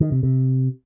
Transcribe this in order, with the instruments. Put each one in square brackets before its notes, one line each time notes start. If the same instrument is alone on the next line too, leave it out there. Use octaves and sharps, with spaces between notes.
[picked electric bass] D#3
C3
C3